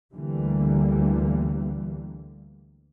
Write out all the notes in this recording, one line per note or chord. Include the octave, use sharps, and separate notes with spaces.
D2 D3 E3 G3 A#3